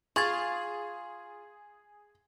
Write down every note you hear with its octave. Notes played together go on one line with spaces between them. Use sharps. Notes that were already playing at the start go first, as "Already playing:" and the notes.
F4 G#4 C#6 G#6 A6